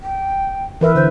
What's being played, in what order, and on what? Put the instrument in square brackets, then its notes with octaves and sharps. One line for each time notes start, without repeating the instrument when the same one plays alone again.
[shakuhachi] G5
[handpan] E3 B4 E5 [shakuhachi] A#4
[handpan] D3 [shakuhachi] C5